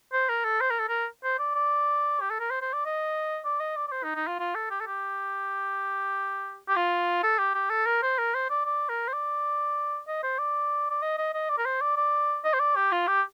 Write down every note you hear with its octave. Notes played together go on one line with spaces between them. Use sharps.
C5
A#4
A4
C5
A#4
A4
A#4
C5
D5
D5
G4
A4
A#4
C5
C5
D5
D#5
D5
D#5
D5
D5
C5
D#4
D#4
F4
F4
A4
G4
A4
G4
G4
F4
A4
G4
G4
A4
A#4
C5
A#4
C5
D5
D5
A#4
C5
D5
D#5
C5
D5
D5
D#5
D#5
D#5
D5
A#4
C5
D5
D5
D#5
C5
D5
G4
F4
G4